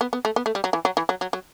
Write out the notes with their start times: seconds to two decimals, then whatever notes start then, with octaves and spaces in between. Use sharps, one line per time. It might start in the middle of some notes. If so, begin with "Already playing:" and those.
0.01 B3
0.13 B3
0.25 A3
0.36 B3
0.46 A3
0.55 G3
0.64 F#3
0.73 E3
0.85 F#3
0.97 E3
1.09 F#3
1.21 F#3
1.33 F#3